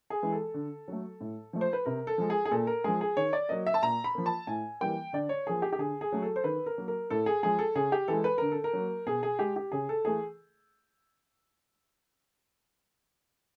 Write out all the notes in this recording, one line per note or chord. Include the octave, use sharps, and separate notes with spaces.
G#4
E3 G#3
A4
D3
F#3 A3
A2
F3 A3
C5
B4
C3 A#4
A4
F3 G#3
G#4
G#4
A#2 A4
A#4
F3 G#3 G#4
G#4
D#3 C#5
D5
F#3 A#3 D#5
E5
A5
A#2 A#5
B5
F3 A#3
A5
A2 G#5
E3 G3 A#3 G5
D3 D5
C#5
F3 A#3 G#4
G4
G4
D3 G#4
G#4
F#3 A3
A4
C5
D#3 B4
A#4
F#3 A#3
A#4
A2 A4
G#4
F3 G#3 G#4
A4
C#3 G#4
G4
E3 G#3 A4
B4
D3 A#4
A4
A#4
F#3 A#3
B2 G#4
G#4
G#3 G4
G4
C#3 G#4
A4
E3 A3 G#4